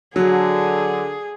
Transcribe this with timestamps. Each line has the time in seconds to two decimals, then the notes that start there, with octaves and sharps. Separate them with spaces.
0.16 D3 F#3 G#4